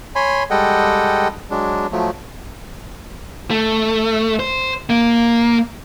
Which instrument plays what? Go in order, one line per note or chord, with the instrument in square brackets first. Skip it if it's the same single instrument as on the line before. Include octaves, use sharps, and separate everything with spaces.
[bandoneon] C#5 G#5 B5 C6
G3 G#3 A4 D#5 F#5 G5
F#3 G#3 D4
F3 F#3 A3
[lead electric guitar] A3
C5
A#3